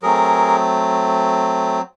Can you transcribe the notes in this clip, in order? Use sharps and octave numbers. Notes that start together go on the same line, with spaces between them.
F#3 A3 C4 G#4 A#4